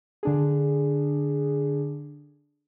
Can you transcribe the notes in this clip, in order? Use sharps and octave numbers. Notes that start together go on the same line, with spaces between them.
D3 D4 G#4